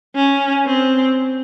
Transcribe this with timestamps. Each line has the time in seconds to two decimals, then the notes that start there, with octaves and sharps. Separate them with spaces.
0.15 C#4
0.66 C4